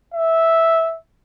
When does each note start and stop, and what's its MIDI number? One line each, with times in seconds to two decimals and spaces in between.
0.14 0.97 76